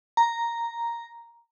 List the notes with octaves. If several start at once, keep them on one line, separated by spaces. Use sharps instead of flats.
A#5